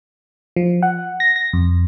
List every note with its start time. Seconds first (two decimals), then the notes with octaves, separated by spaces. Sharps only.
0.56 F3
0.83 F#5
1.20 A#6
1.36 A#6
1.53 F2